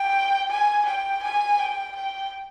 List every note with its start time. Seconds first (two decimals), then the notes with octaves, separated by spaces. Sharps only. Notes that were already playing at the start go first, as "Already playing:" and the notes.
Already playing: G5
0.49 G#5
0.86 G5
1.23 G#5
1.59 G5
1.96 G5